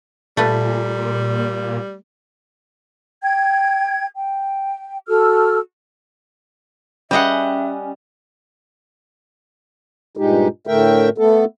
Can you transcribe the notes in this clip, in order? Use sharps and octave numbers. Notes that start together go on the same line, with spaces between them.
A#2 G3 A3 B4
G5 G#6
G5
F#4 A4 E6 F6
G3 C#4 G#4 B4 D#5 E5 F#5 G5
G2 A#2 G#3 D#4 G4
A2 D3 A3 A#4 E5 G5
A3 B3 A4